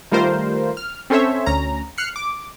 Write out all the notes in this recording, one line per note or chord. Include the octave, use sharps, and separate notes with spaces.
D#3 G3 A3 F4 A#4 C5
F6
C4 C#4 A4 C5 C#5 E5
D2 C#4 A#5
F6 F#6 C7 C#7
D6